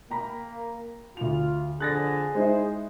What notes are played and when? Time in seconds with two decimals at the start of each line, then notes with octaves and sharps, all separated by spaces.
0.11 A#3 G5 A#5 B5
1.17 D2 F4 F7
1.80 F2 D3 G#4 F#6 A6 A#6
2.35 G#3 D#4 E4 C5